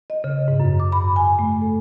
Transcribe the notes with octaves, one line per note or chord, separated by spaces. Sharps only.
D#5
C#3
G#2
F#2
D6
B5
G#5
A3
A4